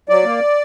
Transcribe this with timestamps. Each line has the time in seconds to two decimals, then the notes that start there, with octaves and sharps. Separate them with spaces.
0.09 F#3 D5
0.24 A#3